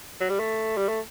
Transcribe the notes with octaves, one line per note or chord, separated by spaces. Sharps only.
F#3
G3
A3
G3
A3